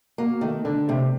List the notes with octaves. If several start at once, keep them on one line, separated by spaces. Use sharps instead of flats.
A#3 F#4
D#3 A3
D3 D4
C3 A3